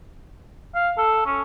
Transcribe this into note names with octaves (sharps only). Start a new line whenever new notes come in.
F5
A4
C#4